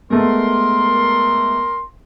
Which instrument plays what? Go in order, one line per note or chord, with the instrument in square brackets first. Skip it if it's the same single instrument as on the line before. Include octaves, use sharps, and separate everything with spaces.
[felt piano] G#3 A3 B3 [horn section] A#4 C6